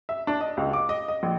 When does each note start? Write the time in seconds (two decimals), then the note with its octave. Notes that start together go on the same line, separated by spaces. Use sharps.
0.09 E5
0.27 D4
0.41 D#5
0.57 C#2
0.73 D6
0.89 D#5
1.08 D#5
1.23 A#1